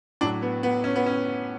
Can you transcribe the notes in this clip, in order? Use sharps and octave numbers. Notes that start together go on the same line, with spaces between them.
A2 F#3 D4
B3
B3
C#4
B3
C#4